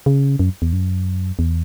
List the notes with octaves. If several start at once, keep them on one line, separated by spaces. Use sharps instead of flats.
C#3
F#2
E2
F#2
E2